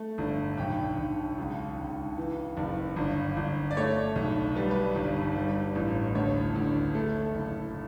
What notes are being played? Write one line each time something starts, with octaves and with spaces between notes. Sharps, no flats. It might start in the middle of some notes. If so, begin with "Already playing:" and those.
Already playing: A3
G1
B1 G5
B1
C#2
C#2
E3
F#1
G1
G1
D5
A3 C#5
B1
G3 B4
B4
G1
G3
A1
D2 C#5
D2
A3
F#1